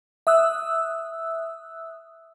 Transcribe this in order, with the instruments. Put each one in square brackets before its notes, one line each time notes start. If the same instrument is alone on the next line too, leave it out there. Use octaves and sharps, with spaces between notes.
[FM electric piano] E5 D#6 E6 F#6